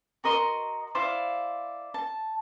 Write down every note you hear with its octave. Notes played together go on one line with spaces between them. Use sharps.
F#4 A#4 D#5 C6
E4 C5 D5 F5
A5